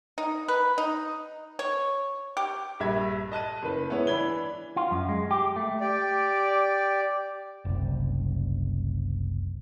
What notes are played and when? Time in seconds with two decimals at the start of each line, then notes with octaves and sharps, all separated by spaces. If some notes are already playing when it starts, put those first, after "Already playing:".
0.18 D#4
0.48 B4
0.78 D#4
1.59 C#5
2.37 G4
2.80 A#1 G2 E5 G#6
3.32 D#5 A5 F#6 D#7
3.63 F#1 B4
3.89 G#3 B3 E4 C#5
4.07 E3 D4 B5 G#6 G7
4.76 F4
4.91 F#2
5.09 G#3
5.31 G4
5.56 A3
5.80 G4 D5
7.65 F#1 C2